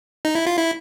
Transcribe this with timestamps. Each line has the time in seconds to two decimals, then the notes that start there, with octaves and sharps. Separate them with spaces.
0.25 D#4
0.35 E4
0.47 F4
0.57 E4